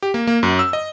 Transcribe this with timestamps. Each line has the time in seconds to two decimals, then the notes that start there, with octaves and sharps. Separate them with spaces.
0.03 G4
0.14 A#3
0.27 A#3
0.43 F#2
0.59 E6
0.73 D#5